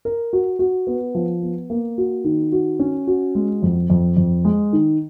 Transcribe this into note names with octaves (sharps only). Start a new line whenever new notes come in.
A#4
F#4
F#4
B3
F3
B3
A#3
F#4
D#3
F#4
C#4
F#4
G#3
F2
F2
F2
G#3
D#3